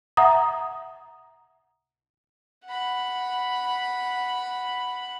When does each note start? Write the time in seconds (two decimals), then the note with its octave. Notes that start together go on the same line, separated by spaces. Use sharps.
0.17 E5 F#5 A#5 D#6
2.65 F#5 B5